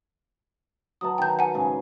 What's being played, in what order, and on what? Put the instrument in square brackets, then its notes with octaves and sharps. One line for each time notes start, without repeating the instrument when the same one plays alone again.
[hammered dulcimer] F#3 B4 A5 [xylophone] D#6
[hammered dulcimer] D#3 A5 [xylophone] G5 G6
[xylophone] F#5 G#5
[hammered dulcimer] G#2 C#3 G#4